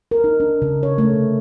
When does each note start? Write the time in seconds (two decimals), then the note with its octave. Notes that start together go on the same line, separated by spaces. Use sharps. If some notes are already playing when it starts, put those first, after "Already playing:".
0.11 A#4
0.24 D#4
0.40 D4
0.62 C#3
0.83 C#5
0.98 A3
1.14 C3